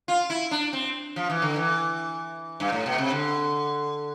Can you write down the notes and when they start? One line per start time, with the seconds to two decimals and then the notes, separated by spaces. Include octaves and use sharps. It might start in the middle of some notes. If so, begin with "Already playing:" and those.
0.08 F4
0.30 E4
0.51 D4
0.73 C4
1.16 F3
1.30 E3
1.42 D3
1.56 E3
2.60 G2
2.72 A2
2.86 B2
2.98 C3
3.11 D3